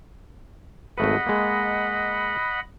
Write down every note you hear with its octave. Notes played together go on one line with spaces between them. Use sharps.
G#1 A3 B4 D#5 F#5 B5
G#3 A#3